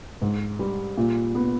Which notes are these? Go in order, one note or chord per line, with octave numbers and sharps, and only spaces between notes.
G#2
G3
A#2
B3